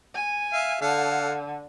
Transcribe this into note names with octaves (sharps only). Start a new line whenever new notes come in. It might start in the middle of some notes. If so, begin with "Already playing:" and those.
G#5
E5 F5
D3 A4 F5 F#5